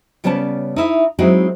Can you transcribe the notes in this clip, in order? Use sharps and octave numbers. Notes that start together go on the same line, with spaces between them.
C#3 G3 B3 C#4 D5 A5
D#4 E4 E5
F#3 G#3 C4 D#4 E4 F#4